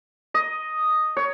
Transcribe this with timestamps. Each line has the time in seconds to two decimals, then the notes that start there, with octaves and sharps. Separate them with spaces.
0.34 D#5
1.17 C#5